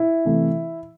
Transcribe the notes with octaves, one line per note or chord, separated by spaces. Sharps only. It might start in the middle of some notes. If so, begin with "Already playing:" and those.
Already playing: E4
C3 E3 A3